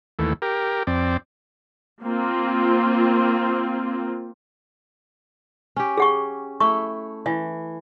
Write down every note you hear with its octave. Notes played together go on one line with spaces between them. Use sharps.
D#2 E3 A3
G4 A#4
F2 C4 D5
A#3 C4 F4
C#4 G4
G#4 F#5 C#6
A3 E4 C#6
E3 E5